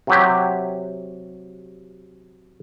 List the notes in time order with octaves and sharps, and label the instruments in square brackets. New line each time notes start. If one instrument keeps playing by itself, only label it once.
[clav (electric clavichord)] C3 F#3 G4